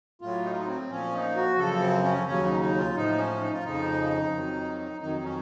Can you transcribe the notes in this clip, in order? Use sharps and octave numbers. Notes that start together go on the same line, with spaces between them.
A2 F#3 F4
D#4
F4
D#4
C4
A#2 F3 C#4
D#4
F#4
F#2 C#3 F3 A4
C4
C#4
D#2 C#3 F#3 C#4
D#4
D#4
F4
A2 F3 D#4
C#4
D#4
F4
F2 C#3 F3 D#4
F2 D#3 F#3
F2 D#3 F#3 D#4
D#4
C#4